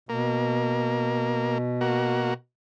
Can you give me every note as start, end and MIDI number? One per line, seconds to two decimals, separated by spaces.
0.09 2.31 47
0.09 1.58 58
1.81 2.34 58
1.81 2.34 66